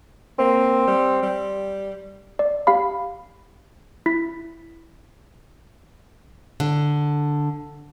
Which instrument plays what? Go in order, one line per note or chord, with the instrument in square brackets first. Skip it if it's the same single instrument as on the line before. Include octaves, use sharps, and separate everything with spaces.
[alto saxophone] A#3 [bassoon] C4
[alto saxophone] G3
G3
[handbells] D5
G4 F5 B5
E4 B6
[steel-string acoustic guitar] D3